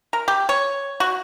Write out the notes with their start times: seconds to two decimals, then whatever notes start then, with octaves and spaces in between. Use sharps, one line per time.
0.13 A#4
0.28 G4
0.49 C#5
1.00 F#4